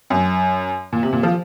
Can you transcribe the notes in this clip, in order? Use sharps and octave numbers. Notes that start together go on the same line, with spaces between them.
F#2
A#2
C3
A#2
F3